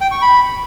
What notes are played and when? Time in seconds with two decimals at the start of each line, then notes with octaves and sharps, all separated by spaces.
0.01 G5
0.11 C#6
0.22 B5